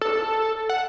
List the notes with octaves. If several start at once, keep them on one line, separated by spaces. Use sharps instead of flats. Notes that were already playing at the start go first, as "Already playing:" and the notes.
A4
F#5